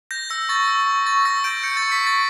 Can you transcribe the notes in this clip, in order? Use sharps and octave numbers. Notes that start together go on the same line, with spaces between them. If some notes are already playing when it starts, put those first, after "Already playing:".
G6 A#6
E6 A#6
C#6 A6
E6
C#6
C#6 A6
E6 A#6
G6 D7
G6 C#7
A6
C#6
B6
C#6
A6